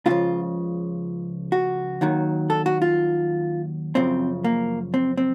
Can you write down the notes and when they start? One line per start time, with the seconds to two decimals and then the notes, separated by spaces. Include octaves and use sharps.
0.06 C#2 C#3 F3 F4
1.52 F#4
2.01 D#2 D#3 F#3
2.50 A4
2.66 F#4
2.82 F4
3.95 F#2 C#3 F3 C4
4.44 A#3
4.94 C4
5.17 C4